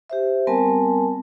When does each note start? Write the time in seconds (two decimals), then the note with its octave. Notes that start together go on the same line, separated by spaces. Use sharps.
0.10 G4 C5 E5
0.47 G3 B3 C4 A#4 G#5 A5